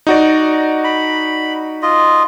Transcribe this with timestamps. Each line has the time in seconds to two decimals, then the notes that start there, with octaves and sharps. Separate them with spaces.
0.07 D#4 F#4 D5
0.84 B5
1.82 F4 D#5